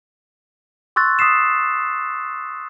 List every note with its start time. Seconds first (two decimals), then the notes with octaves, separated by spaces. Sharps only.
0.96 C6 C#6 E6 F#6 A6
1.19 D#6 B6 C7 E7